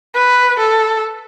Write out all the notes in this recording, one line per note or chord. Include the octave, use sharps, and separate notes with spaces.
B4
A4